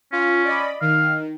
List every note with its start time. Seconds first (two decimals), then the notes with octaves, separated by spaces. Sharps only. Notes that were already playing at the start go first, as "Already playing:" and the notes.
0.12 C#4 F4
0.45 D5 D#5 B5
0.81 D#3 F5